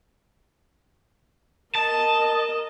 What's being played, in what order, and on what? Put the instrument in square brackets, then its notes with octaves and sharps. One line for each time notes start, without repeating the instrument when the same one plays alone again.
[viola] A#4 D#5 [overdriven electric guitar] A5